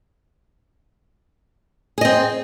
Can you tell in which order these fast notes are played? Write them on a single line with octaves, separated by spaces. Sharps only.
G#4 D#5 C4